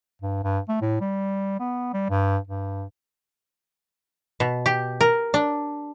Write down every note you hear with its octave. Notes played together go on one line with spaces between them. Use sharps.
G2
G2
A3
A2
G3
B3
G3
G2
G2
B2
G4
A#4
D4